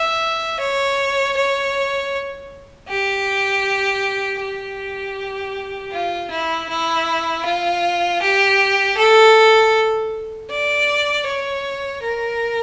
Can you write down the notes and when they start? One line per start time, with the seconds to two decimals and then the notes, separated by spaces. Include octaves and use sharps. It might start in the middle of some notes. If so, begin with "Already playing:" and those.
Already playing: E5
0.60 C#5
1.37 C#5
2.89 G4
4.40 G4
5.92 F4
6.31 E4
6.69 E4
7.45 F4
8.22 G4
8.97 A4
10.50 D5
11.26 C#5
12.02 A#4